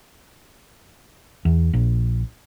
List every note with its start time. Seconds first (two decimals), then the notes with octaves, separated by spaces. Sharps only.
1.45 E2
1.73 A#1